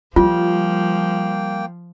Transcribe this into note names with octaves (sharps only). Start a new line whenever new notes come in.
F3 G3 A#3 F4 G5